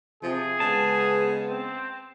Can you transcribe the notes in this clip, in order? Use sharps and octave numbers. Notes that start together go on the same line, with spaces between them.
C3 F3 G#4
C#3 G#3 B3 A5
C4